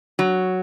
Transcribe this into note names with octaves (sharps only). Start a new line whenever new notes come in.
F#3